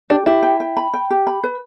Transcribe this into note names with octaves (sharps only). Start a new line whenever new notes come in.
D4 G4
E4 G4
G5
G5
B5
G5
G4
B5
B4